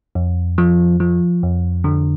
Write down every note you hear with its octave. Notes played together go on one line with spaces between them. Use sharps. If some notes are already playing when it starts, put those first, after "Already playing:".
F2
F3
F3
F2
D3